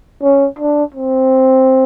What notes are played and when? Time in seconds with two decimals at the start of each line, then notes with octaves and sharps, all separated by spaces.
0.23 C#4
0.59 D4
0.94 C4